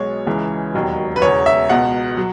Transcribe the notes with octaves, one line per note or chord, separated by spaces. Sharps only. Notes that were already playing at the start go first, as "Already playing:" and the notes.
Already playing: B1 B2 G#3 C#5
C#2 C#3 E3 G#3
E1 D#2 D#3 F#3
B4
E1 E2 C#3 C#5
E5
C#2 B2 G#3 F#5
F#3